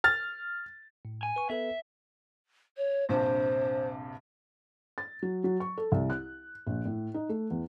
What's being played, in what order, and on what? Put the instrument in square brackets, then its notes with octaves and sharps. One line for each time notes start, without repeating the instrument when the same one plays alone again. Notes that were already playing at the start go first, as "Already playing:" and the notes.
[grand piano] F6 A6
[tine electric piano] A2
[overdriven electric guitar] G#5
[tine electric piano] B4 C#6
[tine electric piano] B3 A4 B4 [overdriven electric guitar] E5
[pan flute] C#5
[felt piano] A#1 G2 C3 [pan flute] C5
[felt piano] A6
F#3
F#3
C#6
A4
C2
F#6
A#1
A2
D#4
A3
E2